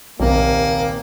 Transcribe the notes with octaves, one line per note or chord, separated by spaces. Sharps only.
D#1 B1 C3 A#3